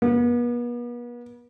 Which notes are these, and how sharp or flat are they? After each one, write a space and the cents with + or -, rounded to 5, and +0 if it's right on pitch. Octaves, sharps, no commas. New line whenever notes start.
B3 -40